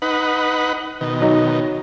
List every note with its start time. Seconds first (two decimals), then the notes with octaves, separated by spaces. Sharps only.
0.02 D#4 B4 F#5
1.01 B2 D#3
1.20 F#3 D#4